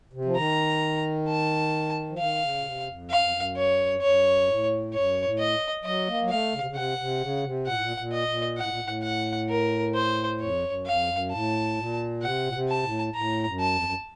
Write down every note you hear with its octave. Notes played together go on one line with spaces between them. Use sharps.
C3
F3
D#3 A#5
A5
F3
D#3 F5
C#3
A#2
C3
F2
F#2 F5
F2
F#2
C#5
F2
F#2 C#5
A2
F#2 C#5
A2
D#5
F#3 D#5
A#3
F#3
A3 F5
C#3
C3
C#3
C3 F#5
C3
C#3
C3
A#2 F#5
A2
A#2
A#2
D#5
A#2
A2 F#5
A#2
A2
F#5
A#4
C5
F2 C#5
F#2
F2 F5
F#2
A2 A5
A#2
C3 F#5
A#2
C3
A5
A2
A2 A#5
F#2
A5
F2
F#2